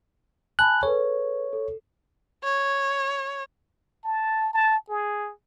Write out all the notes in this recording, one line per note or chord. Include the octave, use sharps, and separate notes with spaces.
G#5 A5 B5 F#6
G#4 A4 B4 C#5
A4
C#5
A5
A5
G#4